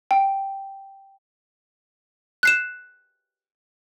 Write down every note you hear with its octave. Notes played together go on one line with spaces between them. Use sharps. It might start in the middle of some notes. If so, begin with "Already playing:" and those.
G5
F#6 C7 E7